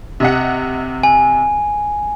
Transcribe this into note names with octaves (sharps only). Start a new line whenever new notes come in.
C3 D#5 F#5
G#5